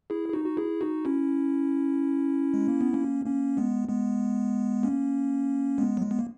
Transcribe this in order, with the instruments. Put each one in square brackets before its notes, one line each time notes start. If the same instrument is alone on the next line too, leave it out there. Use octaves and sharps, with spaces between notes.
[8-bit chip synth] E4 G#4
G#4
D#4 F#4
F#4
E4 G#4
D#4 F#4
C#4 E4
G#3
A#3
B3
A#3 C#4
A#3 C#4
G#3 B3
G#3 B3
A#3 C#4
G#3 B3
F#3
G#3
B3
A#3